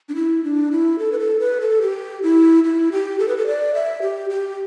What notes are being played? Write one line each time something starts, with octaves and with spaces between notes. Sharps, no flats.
D4
E4
D4
E4
A4
B4
A4
B4
A4
G4
E4
E4
G4
A4
B4
A4
D5
E5
G4
G4